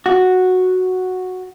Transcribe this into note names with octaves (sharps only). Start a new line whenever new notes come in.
F#4